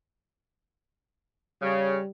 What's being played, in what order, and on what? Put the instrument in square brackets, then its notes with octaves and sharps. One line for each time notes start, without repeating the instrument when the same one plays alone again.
[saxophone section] C#3 [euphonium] G3